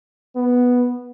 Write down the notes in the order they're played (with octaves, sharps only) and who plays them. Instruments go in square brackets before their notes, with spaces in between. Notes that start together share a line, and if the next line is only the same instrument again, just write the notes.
[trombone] B3